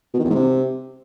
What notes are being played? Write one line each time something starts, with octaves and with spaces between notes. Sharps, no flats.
B2
D#3
E2
G#2
C3